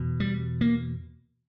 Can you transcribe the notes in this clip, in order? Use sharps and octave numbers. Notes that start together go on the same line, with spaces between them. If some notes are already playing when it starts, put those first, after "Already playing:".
Already playing: E2 B2
G3
A#3